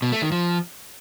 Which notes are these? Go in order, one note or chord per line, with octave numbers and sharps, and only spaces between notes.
B2
A3
D#3
F3